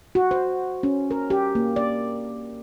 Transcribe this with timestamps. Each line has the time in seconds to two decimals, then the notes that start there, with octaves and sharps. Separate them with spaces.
0.15 F#4
0.31 C5
0.83 C#4
1.11 A#4
1.30 G4
1.55 A#3
1.76 D5